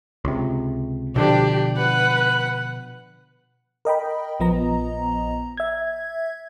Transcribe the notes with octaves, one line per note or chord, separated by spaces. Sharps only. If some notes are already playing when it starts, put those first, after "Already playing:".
C#2 C3
B2 D3 F3 D4 G4
B4 F#5
A#4 D#5 G5 B5
A#1 F3 B3 D#5 A#5
E5 G#6